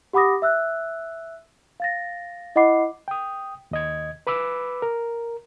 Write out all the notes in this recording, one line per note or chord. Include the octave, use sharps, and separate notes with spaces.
G4 F#5 B5 D6 D#6 A#6
E5 E6 F#6
F5 A6 A#6
E4 D#5 F#5 B5 D6 C7
G5 D#6
D#2 D#5 G#6
B4 B5 D6 E6
A#4